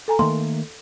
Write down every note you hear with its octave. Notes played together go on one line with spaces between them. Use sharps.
A4 G#5 A#5
D#3 A3 A#3 C6